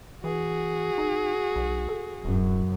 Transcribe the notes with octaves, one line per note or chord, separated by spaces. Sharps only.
E3 F#4 G#4
D#4
B1
A4
D1 F#2